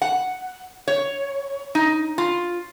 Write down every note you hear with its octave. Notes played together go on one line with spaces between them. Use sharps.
F#5
C#5
D#4
F4